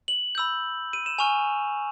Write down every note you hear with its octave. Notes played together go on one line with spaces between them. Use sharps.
F#7
B5 E6 G6
D#7
E7
G#5 C#6 F6 F7